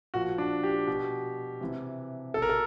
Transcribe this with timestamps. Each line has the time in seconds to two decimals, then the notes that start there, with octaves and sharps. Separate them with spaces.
0.14 A#2 F3 F#4
0.38 D4
0.63 G4
0.87 B2
1.61 C3 E3
2.34 B2 A4
2.42 A#4
2.49 A4